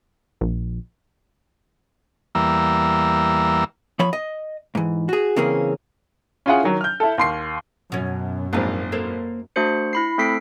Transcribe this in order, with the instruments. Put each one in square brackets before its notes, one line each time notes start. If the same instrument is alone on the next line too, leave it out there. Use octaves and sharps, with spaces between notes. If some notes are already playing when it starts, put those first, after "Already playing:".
[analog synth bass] A#1
[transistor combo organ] E2 E3 G3 A#3 A#5 E6
[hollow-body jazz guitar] F3 C#5 B5
D#5
G#2 E3
F#4 G#4
C#3 E3 A#3 C4 C#4 G#4
[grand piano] C#4 E4 F4 G#4 F#5
D#3 F#3
F6 G6
E4 A4
D#2 C6 C7
[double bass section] F#2 [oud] B2 C#4
[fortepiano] A#1 G#2 C4 [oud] A#3 B4
[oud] A#3 A4 C5
[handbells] A3 D4 F#4 C5 C#7
E4 B5 C7
A3 C4 A4 B6 C7 D7